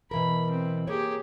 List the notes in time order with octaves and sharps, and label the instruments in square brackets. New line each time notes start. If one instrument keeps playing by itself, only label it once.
[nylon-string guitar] B2 E3 A#4 [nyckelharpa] B5
[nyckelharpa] C4
[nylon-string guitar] A#3 C#5 [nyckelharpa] G4 G#4